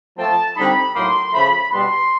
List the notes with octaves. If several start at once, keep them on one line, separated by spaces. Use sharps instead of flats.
F3 A3 C4 A5
D3 G3 C4 D#4 B5
A2 F#3 A#3 D#4 C6
C#3 F3 A3 B5
B2 G3 B3 D4 C6